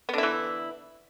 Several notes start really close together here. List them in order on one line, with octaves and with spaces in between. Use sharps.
B3 D3 E4 E3